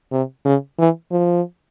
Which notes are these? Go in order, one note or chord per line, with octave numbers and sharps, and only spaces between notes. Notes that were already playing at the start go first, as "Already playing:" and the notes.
C3
C#3
E3
F3